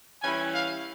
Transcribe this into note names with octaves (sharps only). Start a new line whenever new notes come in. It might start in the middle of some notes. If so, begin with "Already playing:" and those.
E3 G3 C#4 E4 G#5
F5